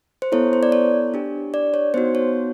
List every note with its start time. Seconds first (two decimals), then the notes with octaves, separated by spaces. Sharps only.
0.22 C5
0.32 B3 E4 A4 C#5
0.53 C5
0.63 D5
0.72 C#5
1.14 D4 G4
1.54 D5
1.74 C#5
1.94 B3 D#4 F#4 C5
2.15 C#5